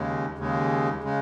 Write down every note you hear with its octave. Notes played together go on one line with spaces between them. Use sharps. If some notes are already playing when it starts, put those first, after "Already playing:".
Already playing: D#2 C#3 G#3
D#2 C#3 G#3
C#3 G#3